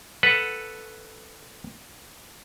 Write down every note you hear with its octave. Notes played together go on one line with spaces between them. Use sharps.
A4 B4 F#5